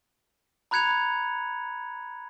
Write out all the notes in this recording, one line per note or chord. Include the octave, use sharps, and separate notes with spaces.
A#5 B5 F#6 G#6 C#7 F7